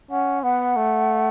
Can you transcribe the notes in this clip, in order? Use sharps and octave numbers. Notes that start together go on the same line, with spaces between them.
C#4 F#5
B3 F#5
A3